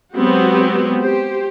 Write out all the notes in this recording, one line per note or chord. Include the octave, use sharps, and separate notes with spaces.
F#3 G#3 B3 C4 F#4 G4
G4 C5